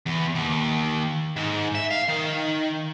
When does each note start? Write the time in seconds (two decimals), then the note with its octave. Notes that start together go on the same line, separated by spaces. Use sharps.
0.06 E2
0.35 D#2
1.36 G#2
1.75 E5
1.90 F5
2.08 D#3